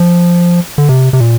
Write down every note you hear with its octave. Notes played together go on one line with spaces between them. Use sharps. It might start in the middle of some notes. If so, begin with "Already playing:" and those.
Already playing: F3
D3
C3
C3
A#2